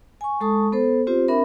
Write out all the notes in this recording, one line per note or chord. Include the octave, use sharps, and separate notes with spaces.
G#5 C#6
G#3 A4 A5 C#6 D#6
B3 A4 C5
C4 F4 G4 C5
C4 D4 A#4 E5 B5